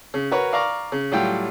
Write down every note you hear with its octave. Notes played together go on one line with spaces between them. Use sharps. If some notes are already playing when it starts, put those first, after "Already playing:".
C#3
F#4 A#4 B4 C#5
D5 F5 A#5 C#6 D6
C#3
A2 F#3 G3 F4 G5